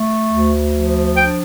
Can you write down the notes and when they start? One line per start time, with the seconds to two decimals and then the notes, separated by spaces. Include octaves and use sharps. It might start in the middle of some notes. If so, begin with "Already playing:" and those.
Already playing: A3
0.29 D2
0.72 F3
1.16 D4 G5